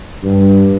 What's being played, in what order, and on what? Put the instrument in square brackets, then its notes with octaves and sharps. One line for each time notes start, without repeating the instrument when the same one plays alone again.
[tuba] G2